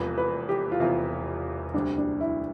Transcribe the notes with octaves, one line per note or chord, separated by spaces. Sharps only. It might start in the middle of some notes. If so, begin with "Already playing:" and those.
Already playing: E1 E2 C3 F3 B4
B4
G4
F4
E1 E2 C3 F3 E4
D2 C3 G3 D4
D4
E4